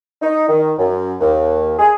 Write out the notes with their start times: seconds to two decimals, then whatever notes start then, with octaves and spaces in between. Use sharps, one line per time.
0.22 D#4
0.49 D#3
0.79 F#2
1.21 D#2
1.79 G#4